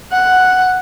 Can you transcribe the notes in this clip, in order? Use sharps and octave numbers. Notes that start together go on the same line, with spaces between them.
F#5